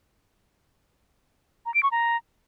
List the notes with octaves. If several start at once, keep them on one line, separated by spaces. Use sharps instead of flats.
A#5
D7
C#6
A#5